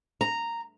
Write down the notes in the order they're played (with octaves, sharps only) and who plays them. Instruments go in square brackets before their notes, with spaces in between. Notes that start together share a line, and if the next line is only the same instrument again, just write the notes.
[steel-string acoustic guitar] A#5